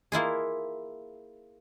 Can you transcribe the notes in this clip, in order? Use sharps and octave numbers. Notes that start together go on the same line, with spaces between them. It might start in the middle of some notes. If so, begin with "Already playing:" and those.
A#3 E4 F4 G#4